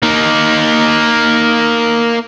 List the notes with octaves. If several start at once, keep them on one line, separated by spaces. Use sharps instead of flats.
A#3 D#4